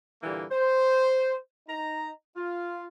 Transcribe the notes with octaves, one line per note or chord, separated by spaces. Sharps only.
A#2 D3 E3 G3 A#3
C5
D#4 A#5
F4